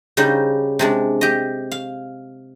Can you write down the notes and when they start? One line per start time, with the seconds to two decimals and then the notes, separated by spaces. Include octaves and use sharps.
0.17 C#3 G3 D#4 C5
0.79 C3 G#3 D4
1.21 G4 D#5
1.71 F5